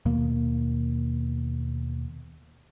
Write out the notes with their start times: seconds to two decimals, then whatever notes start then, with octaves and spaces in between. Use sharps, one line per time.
0.05 D#2 B2 A#3